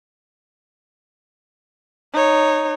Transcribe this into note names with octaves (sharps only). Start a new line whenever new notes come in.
D#4 C#5